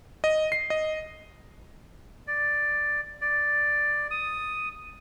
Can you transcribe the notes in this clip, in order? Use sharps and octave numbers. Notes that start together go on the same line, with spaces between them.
D#5
C7
D#5
D5
D5
D#6